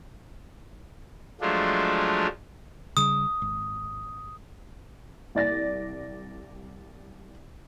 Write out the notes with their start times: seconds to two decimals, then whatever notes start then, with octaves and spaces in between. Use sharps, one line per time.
1.41 F3 F#3 G#3 A3 D4 F4
2.97 C#3 G3 D#6
3.42 G#1
5.35 C2 D5 A6 A#6